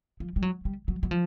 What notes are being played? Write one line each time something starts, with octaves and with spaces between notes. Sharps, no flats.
F3
G3
F#3
G3
F#3
F#3
F3